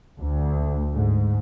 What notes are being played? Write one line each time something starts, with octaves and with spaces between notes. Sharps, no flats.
D2
G#2